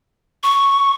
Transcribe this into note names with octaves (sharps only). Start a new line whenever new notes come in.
C#6